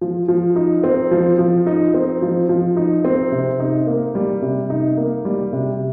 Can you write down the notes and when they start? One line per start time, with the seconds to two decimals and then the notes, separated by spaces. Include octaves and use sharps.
0.01 F3
0.28 F3
0.56 D#4
0.84 C4
1.11 F3
1.39 F3
1.66 D#4
1.94 C4
2.22 F3
2.49 F3
2.77 D#4
3.05 C4
3.32 C3
3.60 D#4
3.87 A#3
4.15 G3
4.42 C3
4.70 D#4
4.97 A#3
5.25 G3
5.53 C3